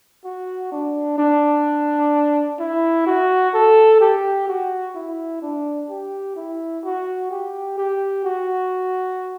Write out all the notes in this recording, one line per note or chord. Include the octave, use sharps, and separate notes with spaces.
F#4
D4
D4
E4
F#4
A4
G4
F#4
E4
D4
G4
E4
F#4
G4
G4
F#4